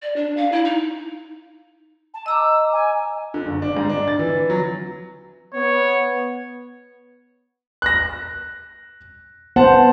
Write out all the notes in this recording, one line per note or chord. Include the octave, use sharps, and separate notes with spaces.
D5
D4
F5
E4
D#4
A5
D#5 A#5 D6 E6
G#5
D3
F#1
D4
G#2
D4
A6
E3
F#3
B3 C#5
F#6 A#6
B3 C5 F#5 A5